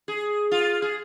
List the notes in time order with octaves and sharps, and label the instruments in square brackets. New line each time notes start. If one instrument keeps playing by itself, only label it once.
[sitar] G#4
F4
G#4